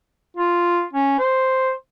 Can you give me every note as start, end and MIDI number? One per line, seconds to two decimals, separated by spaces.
0.37 0.84 65
0.93 1.15 61
1.19 1.72 72